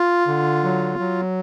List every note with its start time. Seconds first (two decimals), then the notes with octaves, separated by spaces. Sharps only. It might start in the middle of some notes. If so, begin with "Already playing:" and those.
Already playing: F4
0.28 D3
0.64 F#3
0.99 F#3